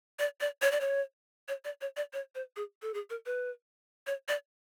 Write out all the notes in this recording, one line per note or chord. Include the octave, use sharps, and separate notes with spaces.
D5
D5
C#5
D5
C#5
C#5
D5
C#5
D5
C#5
C5
G#4
A4
G#4
A#4
B4
C#5
D5